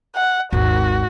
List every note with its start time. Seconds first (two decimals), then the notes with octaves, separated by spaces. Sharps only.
0.16 F#5
0.53 G#1 D#2 F#4